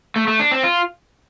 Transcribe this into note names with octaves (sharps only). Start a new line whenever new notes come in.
A3
A3
D4
C4
F4